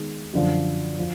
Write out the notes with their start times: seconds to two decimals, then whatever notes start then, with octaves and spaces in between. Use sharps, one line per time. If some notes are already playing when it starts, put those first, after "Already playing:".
Already playing: D#3 G#3 B3
0.33 F#2 D3 F3
0.99 F3